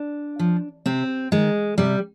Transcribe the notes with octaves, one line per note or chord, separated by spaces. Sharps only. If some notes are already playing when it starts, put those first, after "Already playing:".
Already playing: D4
F3
C3 C4
D#3 G#3
C3 G3